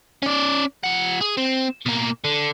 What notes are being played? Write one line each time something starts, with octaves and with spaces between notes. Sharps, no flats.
C#4 D5
F3 F#5
G#4
C4
B2 A#3
D3